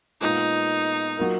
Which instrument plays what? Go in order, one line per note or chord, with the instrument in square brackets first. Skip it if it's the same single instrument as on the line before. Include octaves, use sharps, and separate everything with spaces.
[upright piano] A#2 G#3 B3 F4 G#4 [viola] D#4
[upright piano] F#3 A#3 F4 A#4